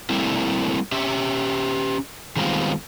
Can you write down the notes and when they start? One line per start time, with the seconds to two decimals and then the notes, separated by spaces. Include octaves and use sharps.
0.10 G3 A3 A#3 C4 E4
0.92 C#4 G4 E5
2.36 D#3 G3 G#3 B3 C4 F4